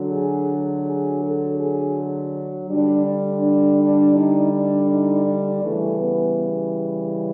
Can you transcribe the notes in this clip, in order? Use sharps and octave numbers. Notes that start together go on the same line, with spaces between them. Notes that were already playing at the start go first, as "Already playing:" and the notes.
Already playing: D3 F#3
G#4
G#4
A4
G#4
D3 G3 D4
D4
D4
D4
D#4
D4
D#4
D4
C#3 E3 G3 A3
B3